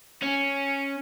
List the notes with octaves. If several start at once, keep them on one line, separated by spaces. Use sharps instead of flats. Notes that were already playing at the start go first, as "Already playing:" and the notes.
C#4